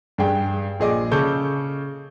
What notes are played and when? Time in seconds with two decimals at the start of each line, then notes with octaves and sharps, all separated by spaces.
0.18 G2 G#4 G5
0.80 A#1 G#4 D#5 D6
1.11 C#3 A4 C#6 D6 G6